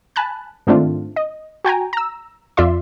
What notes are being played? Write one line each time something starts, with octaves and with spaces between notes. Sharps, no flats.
G#5 A5 B5 F#6
G#2 D#3 A3 C4 D4 F4
D#5
F#4 G5 G#5 A#5
A#5 E6
F2 F4 D5 E5 C6